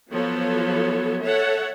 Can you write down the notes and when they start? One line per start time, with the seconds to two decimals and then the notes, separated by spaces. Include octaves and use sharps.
0.12 F3 F#3 B3 A4 C#5
1.23 A4 C#5 E5 F#5